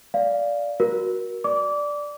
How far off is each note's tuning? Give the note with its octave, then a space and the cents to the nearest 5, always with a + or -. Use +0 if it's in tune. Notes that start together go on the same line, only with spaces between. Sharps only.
D5 -10 F5 +0
F#4 +0 A#4 +20
D5 +0 D6 -25